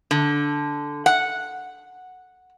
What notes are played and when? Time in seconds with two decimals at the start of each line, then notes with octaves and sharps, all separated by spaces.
0.11 D3
1.06 F#5